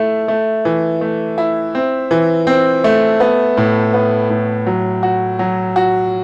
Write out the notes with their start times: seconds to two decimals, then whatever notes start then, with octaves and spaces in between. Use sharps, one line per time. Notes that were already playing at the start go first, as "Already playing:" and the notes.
Already playing: A3 E4
0.28 A3
0.65 E3
1.01 A3
1.38 E4
1.75 C4
2.11 E3
2.47 C4
2.84 A3
3.20 B3
3.57 A2
3.94 B3
4.30 A2
4.66 F#3
5.03 F#4
5.39 F#3
5.76 F#4